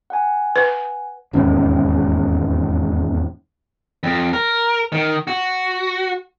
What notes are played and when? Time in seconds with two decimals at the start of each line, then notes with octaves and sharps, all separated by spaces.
0.10 F#5 G#5
0.56 B4
1.33 E1 D#2 G#2 C#4
4.03 F2
4.33 A#4
4.92 D#3
5.27 F#4